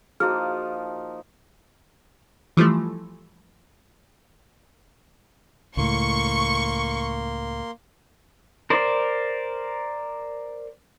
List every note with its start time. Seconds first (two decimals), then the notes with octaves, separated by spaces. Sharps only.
0.20 F3 A#3 D#4 E4 F#4 G#4 F6
2.57 E3 F3 G3 A3
5.77 C#2 A2 A#3 C6 C#6
8.70 A#4 C5 D5